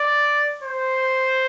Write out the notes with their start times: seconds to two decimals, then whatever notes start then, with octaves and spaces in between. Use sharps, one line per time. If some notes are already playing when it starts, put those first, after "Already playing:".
Already playing: D5
0.63 C5